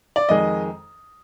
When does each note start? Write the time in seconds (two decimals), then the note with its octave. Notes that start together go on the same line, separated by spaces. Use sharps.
0.16 D5
0.29 F2 D#3 G#3 D#5